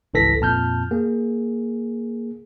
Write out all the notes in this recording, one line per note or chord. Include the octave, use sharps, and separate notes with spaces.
G#1 C#2 E3 A4 A#6 B6
F2 A#2 A5 F6 G6
A#3 G#4